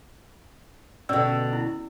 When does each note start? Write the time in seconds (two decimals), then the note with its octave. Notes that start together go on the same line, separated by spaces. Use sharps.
1.09 B2 D3 C#4 D5 E6
1.53 E4